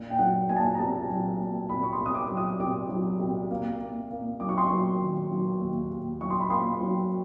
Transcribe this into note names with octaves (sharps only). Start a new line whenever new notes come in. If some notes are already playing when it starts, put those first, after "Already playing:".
Already playing: A#2
G5
F#3 F#5
A#2 G#5
A5
G#5
A#5
C2 A5
F#3
A#2
C2 B5
C#6
C6
C2
D#6
D6
F#3
D#6
C2 D6
F#3
C2
A#3
A#3
A#3
F#3 D6
C#6
C6
F#3 C#6
D#3
F#3
D#2
D#2
F#3 C#6
C6
B5
A#3 C6
F#3